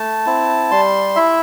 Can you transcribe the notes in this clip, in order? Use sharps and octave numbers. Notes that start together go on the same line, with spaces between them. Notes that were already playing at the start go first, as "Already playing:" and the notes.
Already playing: A3 A5
C4 E4
G3 C6
E4 E5